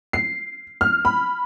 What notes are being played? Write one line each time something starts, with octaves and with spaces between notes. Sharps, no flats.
C7
F6
B5